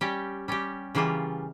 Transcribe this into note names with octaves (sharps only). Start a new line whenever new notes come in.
G3 C#4 G4
G3 C#4 G4
C#3 E3 G3 A#3 F4